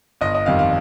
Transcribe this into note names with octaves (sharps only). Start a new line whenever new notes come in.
G1 D#5
D#5
F2 D#3 G3 F5
F5